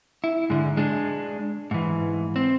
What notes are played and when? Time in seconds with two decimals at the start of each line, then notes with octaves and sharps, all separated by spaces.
0.24 E4
0.50 G#2 D3
0.77 G#3 D4
1.71 G#2 E3
2.36 C4